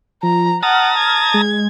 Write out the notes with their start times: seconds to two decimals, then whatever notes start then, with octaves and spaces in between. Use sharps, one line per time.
0.23 F3 A#5
0.63 F#5 A5 A#5 D#6 F6
0.99 G#6
1.34 G#3